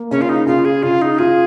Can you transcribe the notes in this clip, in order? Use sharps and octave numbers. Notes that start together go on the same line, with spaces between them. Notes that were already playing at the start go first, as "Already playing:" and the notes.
Already playing: A#3
C#3 C#4
F4
D#4
C#3 F4
G#4
C#3 F4
D#4
F4 G#4